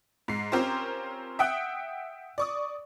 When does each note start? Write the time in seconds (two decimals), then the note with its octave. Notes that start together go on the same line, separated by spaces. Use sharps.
0.28 G#2 C7
0.52 C4 C#4 F4 G4 A#4 C5
1.39 E5 F#5 G5 D#6 F#6
2.38 D5 C#6 D#6